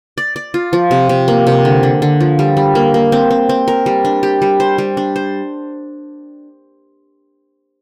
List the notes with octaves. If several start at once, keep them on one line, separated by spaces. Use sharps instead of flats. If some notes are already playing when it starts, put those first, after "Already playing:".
D5
D5
F4
F3
C3
C3
A#3
C3
D3
D3
D3
F3
G3
G3
A#3
A#3
C4
C4
C4
A#4
G3
D4
G4
G3
C5
G3
D4
C5